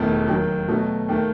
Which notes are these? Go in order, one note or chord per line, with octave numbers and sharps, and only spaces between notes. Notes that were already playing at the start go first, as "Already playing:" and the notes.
Already playing: E1 E2 D#3 A3
D#2 D#3 F#3
B2 F#3 A3
D#2 D#3 A3